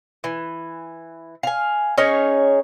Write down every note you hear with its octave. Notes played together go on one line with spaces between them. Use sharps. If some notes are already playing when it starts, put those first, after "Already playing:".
E3
F5 G#5
C#4 D#4 G#4 C#5